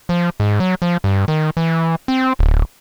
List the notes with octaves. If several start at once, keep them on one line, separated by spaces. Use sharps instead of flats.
F3
G#2
F#3
F3
G2
D#3
E3
C4
D1